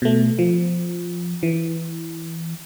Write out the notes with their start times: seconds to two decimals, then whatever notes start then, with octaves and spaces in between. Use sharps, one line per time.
0.02 B2 A3
0.39 F3
1.43 E3